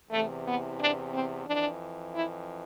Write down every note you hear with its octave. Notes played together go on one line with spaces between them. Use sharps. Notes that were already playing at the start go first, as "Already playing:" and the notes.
E2 C3 E3 A3
B3
D4
C4
F2 E3 D4
E4